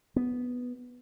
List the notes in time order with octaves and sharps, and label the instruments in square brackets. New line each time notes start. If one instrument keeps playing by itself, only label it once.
[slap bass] B3